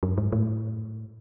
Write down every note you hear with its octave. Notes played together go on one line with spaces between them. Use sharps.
F#2
G#2
A2